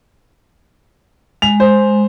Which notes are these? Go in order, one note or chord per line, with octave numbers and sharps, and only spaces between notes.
G#3 F7
C5